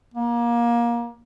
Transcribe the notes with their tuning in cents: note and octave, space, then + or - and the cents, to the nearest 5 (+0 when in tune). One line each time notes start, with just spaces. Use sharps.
A#3 +25